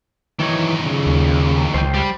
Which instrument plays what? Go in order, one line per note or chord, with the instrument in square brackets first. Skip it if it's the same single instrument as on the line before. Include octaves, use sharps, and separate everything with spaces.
[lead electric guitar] D#3 F#3 [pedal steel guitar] E3 D#4 C#5
[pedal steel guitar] C#3
[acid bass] D#2
[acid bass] C#2 [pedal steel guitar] C5 G5
[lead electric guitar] G3